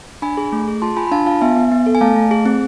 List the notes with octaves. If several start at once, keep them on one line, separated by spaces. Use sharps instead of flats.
D4 G#5 B5
G#4
A3
G#4
F4 A5 C6
F4 G#5 B5
B5
D4 F5 A5
F4 F5 A5
B3 E5 G#5
B3
B3
A4
G#5
A3 F5 A5
A3
G#4
C4